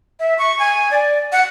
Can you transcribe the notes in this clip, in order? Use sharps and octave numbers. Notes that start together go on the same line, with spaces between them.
E5
C#6
G#5
D5
F#5